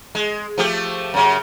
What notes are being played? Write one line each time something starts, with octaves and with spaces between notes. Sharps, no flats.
G#3
F3 A3 G4
F#2 C#3